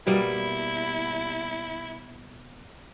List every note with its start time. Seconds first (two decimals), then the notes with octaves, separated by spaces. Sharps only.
0.07 B2 G3 A#3 E4